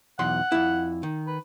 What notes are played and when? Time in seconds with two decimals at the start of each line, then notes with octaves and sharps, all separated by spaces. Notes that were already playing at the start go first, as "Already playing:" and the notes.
0.19 B1 E2 F#5 C6
0.52 F2 E4
1.03 D#3
1.27 B4